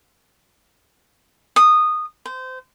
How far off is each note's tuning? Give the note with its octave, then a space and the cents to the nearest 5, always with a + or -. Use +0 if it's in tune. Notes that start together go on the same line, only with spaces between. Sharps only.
D#6 -15
C5 -25